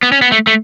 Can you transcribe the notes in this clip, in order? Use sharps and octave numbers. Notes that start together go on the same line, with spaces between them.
B3
C#4
B3
A3
A3